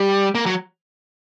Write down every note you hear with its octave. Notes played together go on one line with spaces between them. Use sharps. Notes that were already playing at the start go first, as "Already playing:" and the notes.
Already playing: G3
A#3
F#3